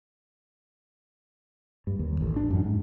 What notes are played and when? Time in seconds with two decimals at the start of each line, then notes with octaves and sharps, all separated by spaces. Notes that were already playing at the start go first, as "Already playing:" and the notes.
1.87 G2
1.99 D#2
2.21 A1
2.36 D4
2.50 F#2
2.65 G#2